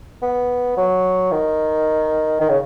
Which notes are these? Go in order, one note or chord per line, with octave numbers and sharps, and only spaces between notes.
B3
F#3
D#3
D#3
C#3